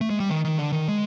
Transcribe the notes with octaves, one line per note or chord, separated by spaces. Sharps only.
A3
G#3
G3
D#3
D#3
D3
D#3
G#3